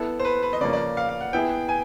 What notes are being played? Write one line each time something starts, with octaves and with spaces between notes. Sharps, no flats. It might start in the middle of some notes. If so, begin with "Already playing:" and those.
Already playing: B3 E4 A4
C5
B4
B4
D#5
C#3 F3 A#3 C#4 D5
D5
F5
F5
F#5
B3 E4 G#4 G5
G#5